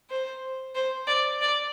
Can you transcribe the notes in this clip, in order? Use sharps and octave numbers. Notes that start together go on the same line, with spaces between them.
C5
C5
D5
D5